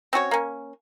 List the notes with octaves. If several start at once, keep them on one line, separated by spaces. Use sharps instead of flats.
C4 C#4 F#4 C#5
A#3 C#4